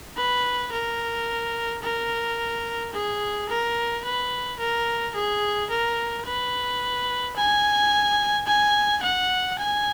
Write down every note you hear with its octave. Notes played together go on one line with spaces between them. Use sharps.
B4
A#4
A#4
G#4
A#4
B4
A#4
G#4
A#4
B4
G#5
G#5
F#5
G#5